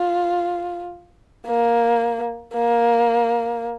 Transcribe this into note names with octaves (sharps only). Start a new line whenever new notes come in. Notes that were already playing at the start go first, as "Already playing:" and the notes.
Already playing: F4
A#3
A#3